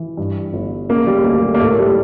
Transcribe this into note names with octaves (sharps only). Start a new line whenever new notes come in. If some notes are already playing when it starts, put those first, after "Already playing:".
Already playing: E3
G2
G1
C#3 A#3
G3
D2 A#3
G3
A#3
A2 A3
G3